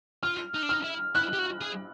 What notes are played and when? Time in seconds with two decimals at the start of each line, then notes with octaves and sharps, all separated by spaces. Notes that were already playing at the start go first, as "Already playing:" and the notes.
0.23 F4 F6
0.54 D#4
0.63 D4
0.69 D#4 F6
0.84 E4
1.15 E4 F#6
1.33 G4
1.39 F#4
1.61 G#4